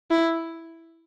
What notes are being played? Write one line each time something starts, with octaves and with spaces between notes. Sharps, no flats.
E4